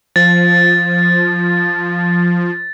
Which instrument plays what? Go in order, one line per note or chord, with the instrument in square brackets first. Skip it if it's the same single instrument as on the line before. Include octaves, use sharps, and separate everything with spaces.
[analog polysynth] F3 [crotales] A6